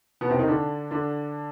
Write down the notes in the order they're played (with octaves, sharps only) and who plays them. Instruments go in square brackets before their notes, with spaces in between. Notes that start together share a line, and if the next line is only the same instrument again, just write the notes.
[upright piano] B2 B3
C3 C4
D#3 D#4
D3 D4
D3 D4